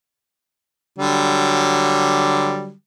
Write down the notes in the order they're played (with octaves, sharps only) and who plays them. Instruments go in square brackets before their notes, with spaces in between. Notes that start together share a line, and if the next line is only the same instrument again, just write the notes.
[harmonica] D3 F#3 G3